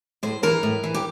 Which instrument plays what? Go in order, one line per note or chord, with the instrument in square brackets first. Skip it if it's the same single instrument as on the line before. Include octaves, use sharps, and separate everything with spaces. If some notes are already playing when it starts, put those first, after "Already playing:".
[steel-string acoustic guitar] A2 C5
E3 A#4
A2
E3
G4